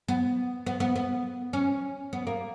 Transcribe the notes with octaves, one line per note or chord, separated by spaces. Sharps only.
B3
B3
B3
B3
C#4
B3
A#3